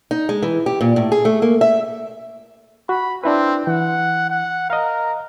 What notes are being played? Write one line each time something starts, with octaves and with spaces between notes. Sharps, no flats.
D#4
G#3
E3
G4
A#2
A2
G#4
A3
A#3
E5
F#4 B5
C4 D4 E4 B4
E3 F#5
F#5
A#4 D#5 F5